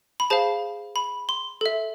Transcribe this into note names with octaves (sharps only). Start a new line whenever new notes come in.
B5
G#4 C5 F5 A5
B5
C6
A4 E5